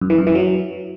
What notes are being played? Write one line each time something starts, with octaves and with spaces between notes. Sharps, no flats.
F#2
E3
F#2
E3
F#3